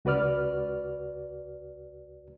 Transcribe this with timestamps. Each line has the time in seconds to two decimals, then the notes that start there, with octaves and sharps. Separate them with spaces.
0.05 C#2 F#4 B4 D5 F6